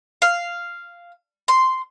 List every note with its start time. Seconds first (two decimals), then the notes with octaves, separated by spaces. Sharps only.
0.22 F5
1.48 C6